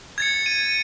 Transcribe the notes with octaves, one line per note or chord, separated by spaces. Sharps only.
G#6 A6 C#7
D#7